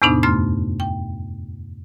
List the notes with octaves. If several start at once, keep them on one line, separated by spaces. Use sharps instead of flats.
E2 A2 C3 B3 D4 D#4
F#2 A3 C6 F6
G5